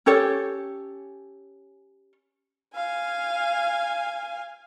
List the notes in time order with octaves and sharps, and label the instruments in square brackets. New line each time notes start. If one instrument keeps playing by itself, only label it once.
[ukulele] C#4 G4 A4 C#5
[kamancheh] F5 G#5